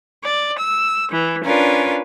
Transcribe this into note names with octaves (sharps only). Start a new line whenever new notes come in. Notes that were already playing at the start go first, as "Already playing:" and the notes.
D5
E6
E3
C#4 D4 F4 A#4 B4